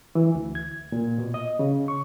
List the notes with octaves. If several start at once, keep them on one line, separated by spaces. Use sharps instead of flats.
E3
D2
G#6
A#2
B2
D#5
C#3
C#6